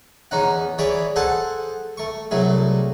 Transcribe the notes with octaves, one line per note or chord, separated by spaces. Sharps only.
E2 C#4 D#4 F#5
E3 G#4 C#5 D5 B5
G#4 A4 C5 F#5 A5
A3 C#6
C2 F#3 A3 G#4